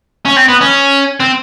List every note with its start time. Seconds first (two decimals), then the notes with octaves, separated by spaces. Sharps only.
0.25 C#4
0.36 C4
0.48 B3
0.61 C#4
1.20 C4